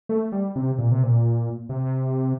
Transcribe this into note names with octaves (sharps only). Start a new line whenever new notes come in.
A3
G3
C3
A#2
C3
A#2
C3